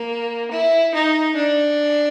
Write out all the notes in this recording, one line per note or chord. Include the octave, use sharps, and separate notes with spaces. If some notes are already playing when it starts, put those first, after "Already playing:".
Already playing: A#3
E4
D#4
D4